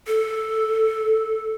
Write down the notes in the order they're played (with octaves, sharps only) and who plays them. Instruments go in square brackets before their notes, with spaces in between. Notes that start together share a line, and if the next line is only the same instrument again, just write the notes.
[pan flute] A4